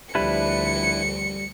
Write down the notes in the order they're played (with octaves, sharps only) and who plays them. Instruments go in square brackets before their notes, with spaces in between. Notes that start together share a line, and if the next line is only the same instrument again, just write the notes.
[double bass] D2 F3 [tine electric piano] G3 [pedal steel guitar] D4 E4 B4 [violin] C#7